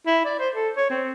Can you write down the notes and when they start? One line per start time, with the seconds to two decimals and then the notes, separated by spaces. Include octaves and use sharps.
0.06 E4
0.25 D5
0.39 C5
0.54 A4
0.76 C#5
0.90 C4